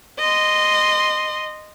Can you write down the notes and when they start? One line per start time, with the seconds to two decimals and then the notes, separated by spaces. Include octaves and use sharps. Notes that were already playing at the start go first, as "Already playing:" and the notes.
0.19 D#5 C6